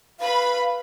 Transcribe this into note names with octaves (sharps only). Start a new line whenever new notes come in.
B4 F5 B5